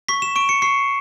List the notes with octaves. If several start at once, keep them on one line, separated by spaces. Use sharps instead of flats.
C#6 B6
E7
C#6 D7
C#7
C#6 C7